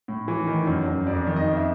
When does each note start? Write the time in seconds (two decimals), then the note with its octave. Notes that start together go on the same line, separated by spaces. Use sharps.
0.08 A2
0.28 E3
0.47 D#3
0.67 F#2
0.87 F#2
1.06 F2 D5
1.27 D#3
1.36 D#5
1.47 F2
1.57 E5